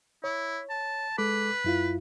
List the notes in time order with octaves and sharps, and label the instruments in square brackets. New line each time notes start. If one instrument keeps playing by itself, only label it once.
[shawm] E4 [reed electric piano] C#5
[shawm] A5
[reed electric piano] G#3 A4 D6 [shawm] B4
[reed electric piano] F#2 E4 F4